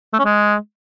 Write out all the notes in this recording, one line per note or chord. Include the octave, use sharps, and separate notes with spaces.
A3
C#4
G#3